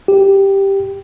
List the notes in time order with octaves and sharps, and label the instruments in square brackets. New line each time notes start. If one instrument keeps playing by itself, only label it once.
[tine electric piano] G4